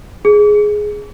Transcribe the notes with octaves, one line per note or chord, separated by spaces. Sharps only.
G#4